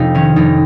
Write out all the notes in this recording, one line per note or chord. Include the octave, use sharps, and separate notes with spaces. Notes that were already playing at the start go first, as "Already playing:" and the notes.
Already playing: F1 C3 D#4 F4
D#3 C#4
F1 D#4